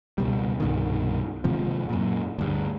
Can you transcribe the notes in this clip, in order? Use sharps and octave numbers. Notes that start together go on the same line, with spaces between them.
C#2 B2 G3
C2 G2 B2 D#3
D#2 G#2 C3 F3
F#2 A#2
D2 G2